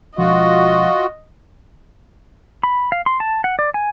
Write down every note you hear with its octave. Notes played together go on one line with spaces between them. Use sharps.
E1 F3 F4 F#4 D#5
B5
F5
C6
A5
F#5
D5
G#5